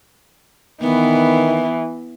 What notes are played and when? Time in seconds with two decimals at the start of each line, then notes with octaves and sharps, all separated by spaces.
0.82 D#3 E3 B3